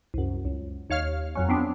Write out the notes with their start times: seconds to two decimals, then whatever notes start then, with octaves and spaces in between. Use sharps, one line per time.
0.14 C2 F#2
0.45 C#2
0.90 D#2 C#5 F5 F6
1.35 F2 F#3 C#4
1.49 B3 C4 D4